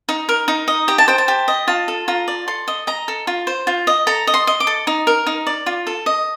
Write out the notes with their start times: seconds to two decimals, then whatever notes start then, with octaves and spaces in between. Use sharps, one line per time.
0.09 D#4
0.29 A#4
0.48 D#4
0.68 D#5
0.88 G4 A#5
0.98 A5
1.08 C5 G5
1.18 A5
1.28 G4
1.48 D#5
1.68 F4 A5
1.88 A4
2.08 F4 A#5
2.28 D5
2.48 A4 C6
2.68 D#5
2.87 D#5 A#5
3.08 A4
3.27 F4
3.47 C5
3.67 F4
3.87 D#5
4.07 A4 A#5
4.27 D#5
4.34 C6
4.47 D#5
4.60 D6
4.67 A4
4.87 D#4
5.07 A#4
5.27 D#4
5.47 D5
5.66 F4
5.87 A4
6.06 D#5